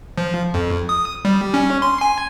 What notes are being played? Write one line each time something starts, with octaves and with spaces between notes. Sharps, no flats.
F3
F2
D#6
G3
C#4
C6
G#5